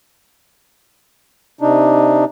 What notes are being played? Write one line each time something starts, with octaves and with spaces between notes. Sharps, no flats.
C3 D4 D#4